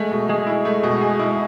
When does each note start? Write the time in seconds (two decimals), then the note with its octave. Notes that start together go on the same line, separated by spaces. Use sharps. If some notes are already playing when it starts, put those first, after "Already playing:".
Already playing: G#3 A3
0.11 B2
0.29 G#3 G#4
0.47 E4
0.65 A3
0.83 B2
1.01 G#4
1.20 E4